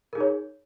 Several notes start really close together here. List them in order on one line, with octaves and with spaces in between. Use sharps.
A#4 G#4 D#4 C#5